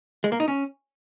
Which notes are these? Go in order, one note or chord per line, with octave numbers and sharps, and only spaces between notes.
G#3
A#3
D#4
C#4